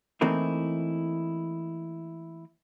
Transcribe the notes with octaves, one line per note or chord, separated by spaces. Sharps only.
E3 A3 A#3 C4 D#4 E4